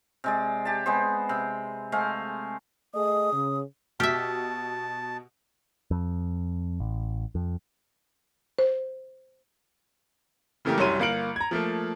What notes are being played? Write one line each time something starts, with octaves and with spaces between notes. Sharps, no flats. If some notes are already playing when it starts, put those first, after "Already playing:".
C3 G#3 D5
G4 A5
G#3 B3 C5
C3
G#3 A3 C5 F5
A3 G#4 D#5 D#6
C#3
B2 G4 E5 A5 E6 F6
F2
A1
F2
C5
C#3 E3 A3 A#3 G4 A#4
C2 F#2 G3 C#5 C6 D#7
G1 A#3 F5 C#7 D7 F#7
A#5 G#6
F3 A3 A#3